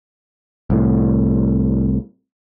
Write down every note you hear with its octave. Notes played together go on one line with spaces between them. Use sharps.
C2 A2